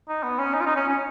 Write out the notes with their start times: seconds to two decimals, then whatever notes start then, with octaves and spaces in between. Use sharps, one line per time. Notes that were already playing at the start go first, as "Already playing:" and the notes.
0.09 D#4
0.23 B3
0.39 C#4
0.54 D#4
0.61 F4
0.66 D#4
0.76 C#4
0.89 C#4